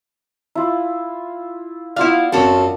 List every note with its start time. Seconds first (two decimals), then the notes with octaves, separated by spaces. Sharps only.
0.55 E4 F4
1.96 B3 E4 F4 D5 F5
2.33 F#2 C4 A4 C#5